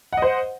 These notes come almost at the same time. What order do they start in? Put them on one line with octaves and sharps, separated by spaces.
F#5 D#5 C5